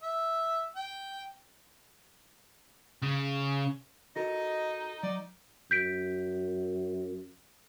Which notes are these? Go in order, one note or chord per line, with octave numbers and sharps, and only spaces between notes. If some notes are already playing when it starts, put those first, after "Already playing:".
E5
G5
C#3
D#4 F#4 A4 A#4 D#5
F#3 D5
F#2 G6 B6 D7